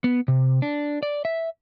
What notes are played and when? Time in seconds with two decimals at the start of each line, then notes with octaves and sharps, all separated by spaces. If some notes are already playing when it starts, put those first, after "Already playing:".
0.04 B3
0.28 C3
0.62 D4
1.03 D5
1.25 E5